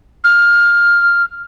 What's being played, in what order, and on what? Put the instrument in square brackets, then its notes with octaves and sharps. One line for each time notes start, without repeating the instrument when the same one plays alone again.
[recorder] F6